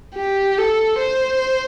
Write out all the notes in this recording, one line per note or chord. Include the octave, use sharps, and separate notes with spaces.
G4
A4
C5